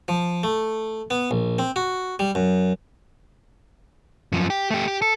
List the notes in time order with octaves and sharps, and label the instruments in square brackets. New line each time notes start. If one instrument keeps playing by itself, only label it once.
[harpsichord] F3
A3
B3
A#1
C4
F#4
G3
F#2
[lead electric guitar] F#2 F3
G4
A3 G4
G4
A4